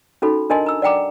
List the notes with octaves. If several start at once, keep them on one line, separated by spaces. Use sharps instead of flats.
C#4 D#4 F#4 A4 B5
D4 A#4 D#5 G#5 A5 C6
A#5 E6
D5 F#5 G5 A#5 D6